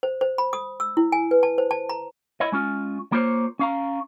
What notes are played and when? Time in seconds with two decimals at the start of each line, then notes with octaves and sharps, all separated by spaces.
0.03 C5
0.21 C5
0.38 B5
0.53 D#6
0.80 E6
0.97 E4
1.12 G#5
1.31 B4
1.43 A5
1.58 C5
1.71 A5
1.89 A#5
2.40 E4 C#5 D#5
2.52 G#3 C#4 F4
3.12 A#3 F4 C5 C#5
3.59 C#4 F5 A#5